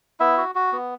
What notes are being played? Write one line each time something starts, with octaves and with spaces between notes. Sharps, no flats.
B3 E4 E5
F#4
F#4
B3